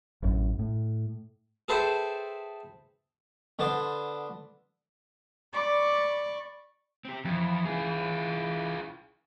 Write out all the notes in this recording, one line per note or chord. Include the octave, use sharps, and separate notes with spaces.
A1 F#2
A2
G#4 A4 B4 C5 E5 G5
D3 B3 C5 A5
D5 B5 C#6 D6
C4 G4
F2 E3
F4 G#4